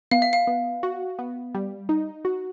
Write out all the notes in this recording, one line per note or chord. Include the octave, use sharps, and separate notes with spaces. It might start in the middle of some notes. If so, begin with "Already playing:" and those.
B3 F5
E5
F5
B3
F#4
B3
G3
D#4
F#4